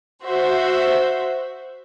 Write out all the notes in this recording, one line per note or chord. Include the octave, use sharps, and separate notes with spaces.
F#4 C5 E5